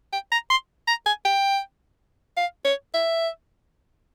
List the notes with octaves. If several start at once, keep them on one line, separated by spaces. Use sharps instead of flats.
G5
A#5
C6
A#5
G#5
G5
F5
C#5
E5